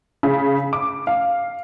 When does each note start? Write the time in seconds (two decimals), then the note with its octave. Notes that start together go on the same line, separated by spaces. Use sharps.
0.23 C#3
0.73 D6
1.07 F5